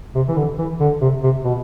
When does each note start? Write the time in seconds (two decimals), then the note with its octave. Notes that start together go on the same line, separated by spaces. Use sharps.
0.15 C3
0.28 E3
0.36 D3
0.58 E3
0.80 D3
1.01 C3
1.23 C3
1.44 B2